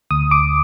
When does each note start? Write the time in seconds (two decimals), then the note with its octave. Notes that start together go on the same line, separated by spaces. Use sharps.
0.11 D2 D#6
0.31 D6